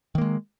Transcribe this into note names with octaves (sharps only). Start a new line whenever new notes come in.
D#3 G#3 A#3